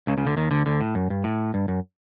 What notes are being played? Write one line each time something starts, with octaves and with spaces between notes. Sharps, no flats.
C#2 C#3
C#2 C#3
D2 D3
D#2 D#3
D2 D3
D2 D3
A2
F#2
G2
A2
G2
F#2